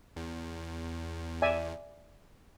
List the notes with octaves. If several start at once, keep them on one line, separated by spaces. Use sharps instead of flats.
E2
D5 E5 G#5